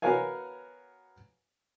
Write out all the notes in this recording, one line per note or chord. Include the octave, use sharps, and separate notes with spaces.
B3 F#4 A#4 C#5 F5 G#5